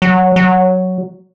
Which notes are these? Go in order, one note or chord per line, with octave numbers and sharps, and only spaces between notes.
F#3
F#3